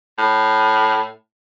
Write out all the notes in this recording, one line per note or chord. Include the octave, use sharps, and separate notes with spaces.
A2